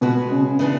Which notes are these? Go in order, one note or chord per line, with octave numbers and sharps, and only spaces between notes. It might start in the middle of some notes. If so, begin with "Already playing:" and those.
B2 G#3 B3 F#4 B4
C#3
C#3
C#3 E3 B3 D4